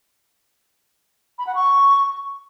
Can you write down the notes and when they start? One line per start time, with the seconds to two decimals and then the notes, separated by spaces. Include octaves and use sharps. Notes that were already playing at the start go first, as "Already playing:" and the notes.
1.38 B5
1.47 F#5
1.55 C#6